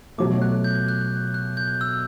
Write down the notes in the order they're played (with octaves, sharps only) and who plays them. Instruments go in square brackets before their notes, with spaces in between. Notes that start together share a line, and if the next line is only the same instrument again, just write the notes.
[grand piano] B2 F#3 A3 [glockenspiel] D6
[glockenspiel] F#6
G6
F#6
F#6
G6
E6